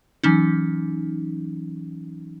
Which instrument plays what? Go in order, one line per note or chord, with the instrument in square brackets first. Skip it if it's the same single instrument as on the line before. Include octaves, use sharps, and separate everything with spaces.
[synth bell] E3 F#3 C#4 D#4